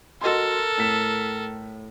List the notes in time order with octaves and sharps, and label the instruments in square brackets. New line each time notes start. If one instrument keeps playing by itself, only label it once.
[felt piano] F#4 D#5 C6 [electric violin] A4 A#4
[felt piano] A2 B6 E7